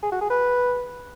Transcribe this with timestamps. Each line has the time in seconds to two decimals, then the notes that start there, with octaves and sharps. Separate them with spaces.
0.03 G#4
0.12 F#4
0.21 G#4
0.30 B4